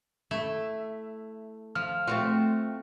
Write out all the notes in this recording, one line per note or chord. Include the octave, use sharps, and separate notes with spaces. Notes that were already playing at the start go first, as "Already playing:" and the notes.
A3 E4 E5
F3 F6
A3 C4 F4 F#4